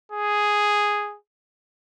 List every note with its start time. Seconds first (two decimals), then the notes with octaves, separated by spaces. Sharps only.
0.12 G#4